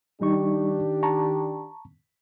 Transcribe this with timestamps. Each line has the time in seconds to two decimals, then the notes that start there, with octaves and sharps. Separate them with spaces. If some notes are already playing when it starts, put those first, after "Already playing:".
0.21 D#3 G3 D4 D#4 G4 C#6
1.03 A5 A#5 C#6